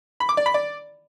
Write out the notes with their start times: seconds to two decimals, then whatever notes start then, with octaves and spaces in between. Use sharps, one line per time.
0.20 B5
0.29 D6
0.37 D5
0.46 B5
0.54 D5